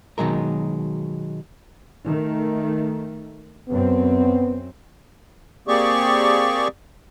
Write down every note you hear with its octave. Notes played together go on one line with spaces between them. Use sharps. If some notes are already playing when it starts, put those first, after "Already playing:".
B2 D#3 F#3 G#3 A#4
D#3 A3
F#2 B3 C4
A#3 C4 G4 G#4 D5 C#6